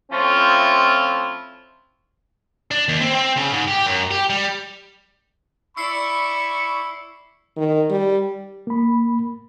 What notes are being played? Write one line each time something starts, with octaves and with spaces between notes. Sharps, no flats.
F3 A3 C4 C#4 E4 F4
D4
D#2
C4
C4
C#3
G#2
G4
F#2
G4
G3
E4 D5 B5 C#6 E6 C7 C#7
D#3
G3
A#3 B5